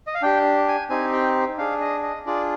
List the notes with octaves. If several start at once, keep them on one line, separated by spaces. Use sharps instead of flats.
D#5
F5
D4 G4 G5
G#5
C4 D#4 G4 G#5
G5
D4 G#4 F5
D#5
D#5
D4 F4 G#4 D5